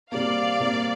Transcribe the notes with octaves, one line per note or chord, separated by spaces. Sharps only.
C3 G3 A#3 D5 F5
C3 G3 A#3